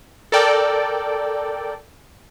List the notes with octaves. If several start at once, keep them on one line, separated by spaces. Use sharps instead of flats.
A4 A#4 D5 G5